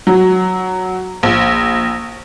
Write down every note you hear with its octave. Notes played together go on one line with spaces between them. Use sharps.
F#3
A#1